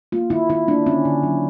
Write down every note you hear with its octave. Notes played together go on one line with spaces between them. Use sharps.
A#3 F4
D#3 E4
D#3 E4
A#3 D4
D3 C#4
D3
F#3